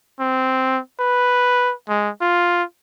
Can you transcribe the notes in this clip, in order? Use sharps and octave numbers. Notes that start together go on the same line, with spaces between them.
C4
B4
G#3
F4